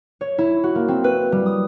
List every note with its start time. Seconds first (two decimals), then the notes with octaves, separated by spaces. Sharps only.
0.21 C#5
0.38 E4
0.63 F#4
0.75 A#3
0.88 C4
1.04 B4
1.32 G3
1.46 D#6